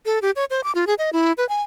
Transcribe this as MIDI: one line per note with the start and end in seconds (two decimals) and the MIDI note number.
0.06 0.19 69
0.22 0.31 67
0.36 0.45 73
0.50 0.63 72
0.64 0.72 86
0.75 0.85 65
0.87 0.94 68
0.99 1.10 75
1.13 1.32 64
1.38 1.47 71
1.49 1.62 80